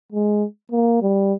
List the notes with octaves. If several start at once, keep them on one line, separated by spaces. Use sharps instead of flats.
G#3
A#3
G3